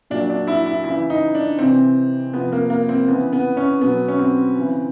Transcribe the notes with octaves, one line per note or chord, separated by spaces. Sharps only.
A#2 F#3 D4
D4
E4
E4
C#3 E3 E4
D#4
D4
C3 E3 C4
C3 F3 B3
A#3
A#3
C4
C#3 E3 B3
B3
C#4
B2 F#3 B3
C#4
C4
C#3 E3